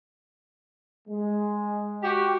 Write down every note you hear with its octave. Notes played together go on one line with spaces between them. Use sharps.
G#3
F#4 G4